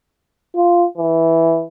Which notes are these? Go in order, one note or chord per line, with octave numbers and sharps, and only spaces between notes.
F4
E3